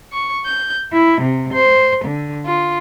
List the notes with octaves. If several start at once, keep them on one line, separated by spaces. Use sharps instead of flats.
C#6
G6
E4
C3
C5
D3
F4